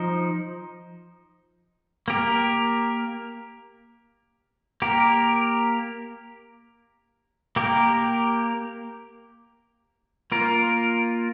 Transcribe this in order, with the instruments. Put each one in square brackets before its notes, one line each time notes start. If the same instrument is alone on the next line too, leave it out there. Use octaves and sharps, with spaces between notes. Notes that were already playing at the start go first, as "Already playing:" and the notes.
Already playing: [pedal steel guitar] F3 D#4 C5
A#3 G4 A#4
A#3 G4 A#4
A#3 G4 A#4
A#3 F4 A#4